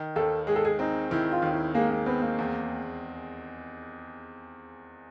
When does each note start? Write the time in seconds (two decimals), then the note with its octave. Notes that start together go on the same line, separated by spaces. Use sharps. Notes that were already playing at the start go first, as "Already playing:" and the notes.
Already playing: D#3
0.16 D#2 A4
0.47 G#3 G#4
0.56 A4
0.65 G#4
0.79 C4 D#4
1.11 D#3 E4
1.32 F4
1.42 D#2
1.53 E4
1.75 G#3 A#3
1.91 A#3
2.06 B3 C4
2.22 A#3
2.38 E2